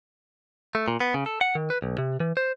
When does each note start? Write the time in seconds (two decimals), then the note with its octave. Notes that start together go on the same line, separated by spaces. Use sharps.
0.75 A3
0.88 A#2
1.00 B3
1.14 C#3
1.26 A4
1.41 F#5
1.55 D#3
1.70 B4
1.82 B1
1.98 C3
2.20 E3
2.37 C5